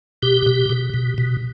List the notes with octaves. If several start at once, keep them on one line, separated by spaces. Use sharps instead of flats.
B2 G4
B2
B2
B2
B2